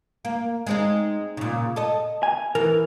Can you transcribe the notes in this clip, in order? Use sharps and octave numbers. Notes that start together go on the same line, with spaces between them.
A#3
G#3 C4 D#4
A#2 C#3
A4 D#5
G#5
E3 A#4